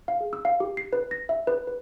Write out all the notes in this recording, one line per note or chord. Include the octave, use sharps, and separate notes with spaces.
F5
G#4
E6
F5
G4
C7
B4
A#6
E5
B4
B4